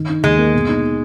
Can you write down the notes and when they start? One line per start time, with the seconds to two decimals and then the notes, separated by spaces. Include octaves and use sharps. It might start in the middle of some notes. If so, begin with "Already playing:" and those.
Already playing: D#3
0.09 D#4
0.23 D#2 G#3
0.38 A#3
0.53 B2
0.68 D#4